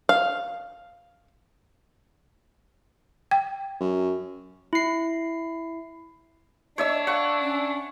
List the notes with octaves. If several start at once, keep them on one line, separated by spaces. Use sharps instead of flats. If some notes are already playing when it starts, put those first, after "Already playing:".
F5
G5
F#2
E4 C7
D4 C#5 D#5 E5 E6
F5 F#5 C#6
C#4